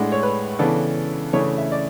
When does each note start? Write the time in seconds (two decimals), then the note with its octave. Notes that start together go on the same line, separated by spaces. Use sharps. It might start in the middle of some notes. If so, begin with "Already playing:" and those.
Already playing: A2 G#3 D4 F#5
0.12 C#5
0.23 B4
0.59 C#3 E3 B3 D4 A4
1.33 C#3 E3 A3 D4 C#5
1.58 E5
1.72 D5